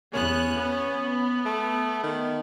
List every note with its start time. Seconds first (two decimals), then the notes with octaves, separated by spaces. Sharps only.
0.14 E2 B3 C#4 F#6
0.56 B3
1.45 A3
2.03 D#3